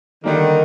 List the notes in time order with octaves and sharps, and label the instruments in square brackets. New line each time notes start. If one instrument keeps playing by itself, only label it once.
[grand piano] D3 G3 A#3 [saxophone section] D#3